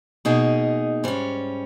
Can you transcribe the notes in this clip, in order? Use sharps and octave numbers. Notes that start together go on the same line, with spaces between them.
B2 A#3 D#4 G#4
G#2 G3 C#4